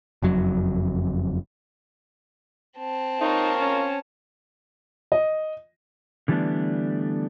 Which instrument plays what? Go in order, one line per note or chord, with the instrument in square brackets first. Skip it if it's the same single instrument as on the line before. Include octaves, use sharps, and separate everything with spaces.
[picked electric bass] F#1 F2 F#3
[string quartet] C4 A5
[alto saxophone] D#4 [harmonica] F4 A#4 C#5
[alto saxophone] C#4
[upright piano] D#5
[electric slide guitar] D3 E3 G3 A3 B3 D4